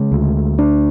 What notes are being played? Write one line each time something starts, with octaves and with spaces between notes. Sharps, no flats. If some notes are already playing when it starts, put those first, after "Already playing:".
Already playing: C#3 G#3
D2
D4